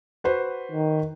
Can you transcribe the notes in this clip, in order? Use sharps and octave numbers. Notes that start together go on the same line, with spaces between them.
F#4 B4 C5
D#3